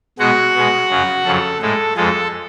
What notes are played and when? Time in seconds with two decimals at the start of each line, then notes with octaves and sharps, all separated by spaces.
0.19 B2 G#3 F#4 F#5
0.55 B2 G#3
0.90 F#2 C#3 F#3
1.25 F2 C#3 F#3 A4
1.60 A2 G#3 A4
1.96 F2 F3 G#3 A4